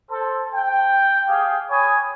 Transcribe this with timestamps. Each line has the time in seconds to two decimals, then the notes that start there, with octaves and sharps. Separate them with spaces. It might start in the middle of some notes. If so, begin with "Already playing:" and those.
0.10 A4 C5
0.54 G5
1.28 G4 G#4 F5 G5
1.70 C#5 G#5 B5 D#6